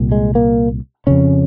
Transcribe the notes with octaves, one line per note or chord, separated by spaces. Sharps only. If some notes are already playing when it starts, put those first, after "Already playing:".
Already playing: C2 A#2
G#3
A#3
F2 C#3 C#4